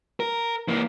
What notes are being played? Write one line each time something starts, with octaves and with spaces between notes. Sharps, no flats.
A#4
E3 A#3